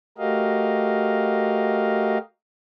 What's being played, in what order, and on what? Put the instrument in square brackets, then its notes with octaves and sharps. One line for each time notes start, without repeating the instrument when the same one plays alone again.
[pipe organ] A3 F#4 G4 A#4 D#5 F5